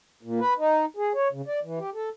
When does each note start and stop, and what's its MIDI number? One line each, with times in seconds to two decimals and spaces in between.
0.23 0.40 46
0.40 0.54 71
0.58 0.85 63
0.97 1.13 68
1.15 1.28 73
1.33 1.42 49
1.47 1.60 74
1.63 1.79 52
1.79 1.90 67
1.94 2.09 69